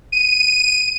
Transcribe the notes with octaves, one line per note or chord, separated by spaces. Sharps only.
D#7